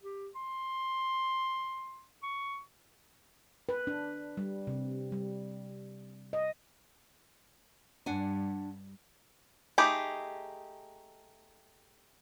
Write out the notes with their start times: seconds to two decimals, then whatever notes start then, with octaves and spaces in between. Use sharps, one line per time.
0.02 G4
0.35 C6
2.23 C#6
3.69 B4
3.87 D4
4.37 G3
4.67 C3
5.12 G3
6.33 D#5
8.06 G2 D4 F#5 G#5
9.78 A3 D#4 G4 G#4 B5